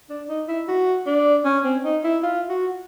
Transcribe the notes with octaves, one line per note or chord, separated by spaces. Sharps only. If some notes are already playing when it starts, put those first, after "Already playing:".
D4
D#4
E4
F#4
D4
C#4
C4
D#4
E4
F4
F#4